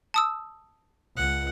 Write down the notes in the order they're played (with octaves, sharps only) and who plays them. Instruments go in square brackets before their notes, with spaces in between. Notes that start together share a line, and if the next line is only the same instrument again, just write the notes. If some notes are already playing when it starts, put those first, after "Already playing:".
[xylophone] A5 D#6 E6
[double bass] C#2 [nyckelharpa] F#5